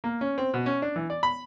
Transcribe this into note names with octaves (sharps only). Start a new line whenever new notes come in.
A#3
C#4
C4
B2
C#4
D4
E3
D5
B5